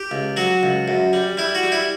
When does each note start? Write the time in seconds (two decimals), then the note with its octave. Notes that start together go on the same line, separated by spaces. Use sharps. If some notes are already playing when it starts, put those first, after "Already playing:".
Already playing: G4
0.11 C#2
0.37 F#3 F#4
0.63 C#2
0.88 F#2
1.13 G3
1.37 G3 E4
1.55 F#4
1.63 G3
1.72 E4